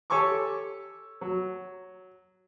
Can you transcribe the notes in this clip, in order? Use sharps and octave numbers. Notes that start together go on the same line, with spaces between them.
G4 A4 C#5 G#5 C#6 D6
F#3